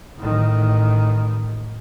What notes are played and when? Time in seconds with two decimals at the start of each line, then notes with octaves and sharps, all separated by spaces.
0.18 A1 D#3